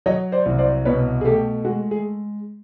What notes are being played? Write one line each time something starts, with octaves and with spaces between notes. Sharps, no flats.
F#3 C#5 D#5
C5 D5
C2
C5 D5
B2 B4 C#5
G#4
A3 G4 A4
G#3 F#4 G#4
G#4